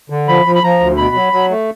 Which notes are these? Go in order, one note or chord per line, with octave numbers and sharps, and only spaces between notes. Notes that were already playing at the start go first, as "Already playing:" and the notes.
D3
F3 B5
F3
B5
F3 A#5
D2
B2 B5
F#3
F#3
A3